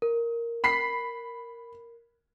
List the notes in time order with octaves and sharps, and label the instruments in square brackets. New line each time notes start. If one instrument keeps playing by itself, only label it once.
[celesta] A#4
[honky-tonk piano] B5 B6 C7